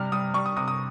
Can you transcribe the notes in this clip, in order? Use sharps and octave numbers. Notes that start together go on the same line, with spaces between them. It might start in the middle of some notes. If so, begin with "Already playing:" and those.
Already playing: C3 G3 F6
G3 D#6
G3 C#6
D#6
C3 D#6
D#6